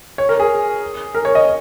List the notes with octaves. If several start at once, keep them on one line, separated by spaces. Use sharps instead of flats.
C#5
A#4
G#4
A#4
C#5
D#5